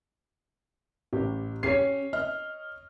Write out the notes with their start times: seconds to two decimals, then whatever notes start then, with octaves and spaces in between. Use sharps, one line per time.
1.13 A1 G4
1.63 C#4 G4 C#5 C7
2.13 D#5 F6